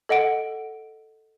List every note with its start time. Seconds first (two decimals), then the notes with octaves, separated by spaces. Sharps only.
0.09 A4 D#5 F#5 D7